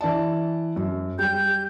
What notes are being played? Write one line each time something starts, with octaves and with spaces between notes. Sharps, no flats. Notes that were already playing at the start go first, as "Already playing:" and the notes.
E3 D5 A5
F#2
G3 G4 G6